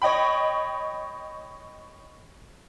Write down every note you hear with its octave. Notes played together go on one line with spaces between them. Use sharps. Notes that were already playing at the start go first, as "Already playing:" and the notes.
C#5 D#5 G5 B5